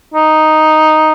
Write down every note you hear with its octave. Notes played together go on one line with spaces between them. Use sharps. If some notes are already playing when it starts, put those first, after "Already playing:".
D#4